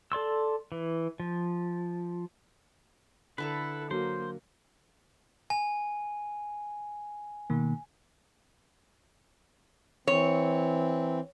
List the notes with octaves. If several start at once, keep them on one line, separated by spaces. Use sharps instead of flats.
A4 D5 C6 E6
E3
F3
D3 E4 A4 B4 A5 A#5
F#3 A#3 C5
G#5
B2 D#3 A#3
E3 C4 C#5